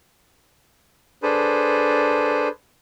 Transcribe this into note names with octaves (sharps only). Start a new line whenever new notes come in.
D4 G#4 A4 B4 C5